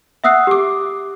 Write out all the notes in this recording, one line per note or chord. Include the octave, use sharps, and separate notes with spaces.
E5 F#5 D#6 E6 F#6 C7
G4 D6